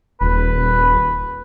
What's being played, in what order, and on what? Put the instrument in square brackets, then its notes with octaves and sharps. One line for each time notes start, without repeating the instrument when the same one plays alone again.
[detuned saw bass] D#1 [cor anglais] B4